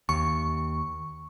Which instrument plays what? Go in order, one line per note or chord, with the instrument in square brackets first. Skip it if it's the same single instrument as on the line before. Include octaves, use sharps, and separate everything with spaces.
[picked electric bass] D#2 [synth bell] C#6